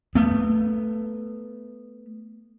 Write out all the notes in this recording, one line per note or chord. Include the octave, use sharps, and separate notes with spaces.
A3 B3